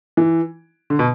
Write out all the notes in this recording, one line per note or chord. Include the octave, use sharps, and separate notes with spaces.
E3
D3
B2